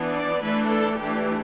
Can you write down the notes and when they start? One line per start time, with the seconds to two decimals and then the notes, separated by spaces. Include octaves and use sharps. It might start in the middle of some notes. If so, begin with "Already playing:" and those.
Already playing: E3 B3 D4
0.12 D5
0.41 E3 A3 D4 B4
0.69 A4
0.98 E3 A3 D4 G4